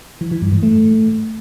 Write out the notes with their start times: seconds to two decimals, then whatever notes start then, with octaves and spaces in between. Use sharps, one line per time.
0.21 E3
0.31 E3
0.42 G2
0.52 G#2
0.63 A3